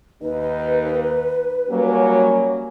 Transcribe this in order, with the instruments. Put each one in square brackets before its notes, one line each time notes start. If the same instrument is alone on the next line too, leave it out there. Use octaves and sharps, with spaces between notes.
[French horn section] D#2 D#4 [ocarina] B4
[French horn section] F#3 G3 [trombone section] A#3 C#4